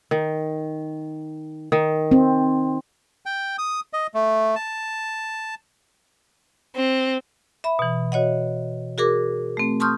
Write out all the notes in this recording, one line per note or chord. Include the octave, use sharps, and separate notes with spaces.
D#3
D#3
C4
G5
D#6
D#5
A3
A5
C4
E5 B5
B2 E3
F#4 C#5 D#5 F#5
F#4 G#4 A#4 D6
A3 C4
A5 C6 C#6 D#6 F6 G6